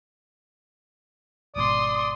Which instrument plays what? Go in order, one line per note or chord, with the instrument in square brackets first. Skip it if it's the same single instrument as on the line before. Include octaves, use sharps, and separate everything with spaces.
[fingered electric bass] G#1 G#2 B2 [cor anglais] D5 [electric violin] C6 D#6